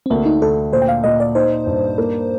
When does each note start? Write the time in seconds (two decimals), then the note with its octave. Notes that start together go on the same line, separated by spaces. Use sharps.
0.06 C4
0.10 D2 A#3
0.25 D#4
0.42 D2 A4
0.73 A#2 C5
0.82 G5
0.88 F5
1.04 A#2 D#5
1.20 D5
1.35 D#4 C5
1.66 G2
1.98 A#3